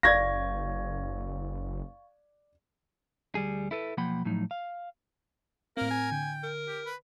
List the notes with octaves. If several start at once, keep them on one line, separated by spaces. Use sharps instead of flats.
F#1 D5 F5 C#6 G#6 A#6
D2 G3 G#4
E4 A4 B4
B1 F3 A#3 F#5 G5 B5
A2 F3 F#3 D#4
F5
A2 A#3 C4 A#4
G#5
D3 G5
A#4
G4
B4